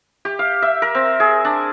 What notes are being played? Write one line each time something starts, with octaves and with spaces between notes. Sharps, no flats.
G4
F5
E5
A#4
C4
G#4
D4